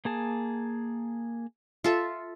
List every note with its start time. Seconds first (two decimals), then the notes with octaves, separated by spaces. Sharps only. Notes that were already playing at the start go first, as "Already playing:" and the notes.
0.05 A#3 G#4 A5
1.84 F4 A4 E5